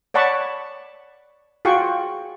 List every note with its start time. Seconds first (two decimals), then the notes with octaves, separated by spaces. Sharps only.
0.14 C#5 D5 F#5 A5 B5 C#6
1.65 F4 F#4 G#4 F#5 G5 C#6